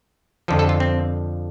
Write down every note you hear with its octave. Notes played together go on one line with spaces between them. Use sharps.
F2 D3 F3 A4
A4
F4
C4